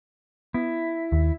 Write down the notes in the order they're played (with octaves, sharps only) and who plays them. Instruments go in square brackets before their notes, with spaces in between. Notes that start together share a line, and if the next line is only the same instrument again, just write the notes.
[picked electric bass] B3 [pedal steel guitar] E4
[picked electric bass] D#2